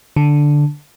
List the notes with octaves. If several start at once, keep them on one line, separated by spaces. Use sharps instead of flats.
D3